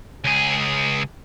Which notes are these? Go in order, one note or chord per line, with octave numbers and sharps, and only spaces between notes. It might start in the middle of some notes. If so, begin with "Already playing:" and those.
C#2 G#4